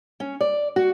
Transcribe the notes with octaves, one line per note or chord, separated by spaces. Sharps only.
C#4
D5
F#4